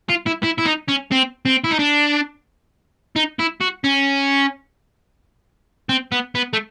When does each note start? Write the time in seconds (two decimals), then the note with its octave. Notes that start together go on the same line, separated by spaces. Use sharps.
0.09 F4
0.26 E4
0.43 E4
0.58 E4
0.65 D#4
0.88 C#4
1.11 C4
1.46 C4
1.64 E4
1.71 D#4
1.79 D4
3.16 D#4
3.39 E4
3.61 F#4
3.84 C#4
5.89 C4
6.12 B3
6.35 B3
6.53 A3